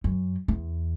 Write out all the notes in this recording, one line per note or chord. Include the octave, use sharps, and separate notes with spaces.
F#2
E2